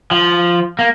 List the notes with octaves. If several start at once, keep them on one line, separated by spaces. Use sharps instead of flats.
F3
A#3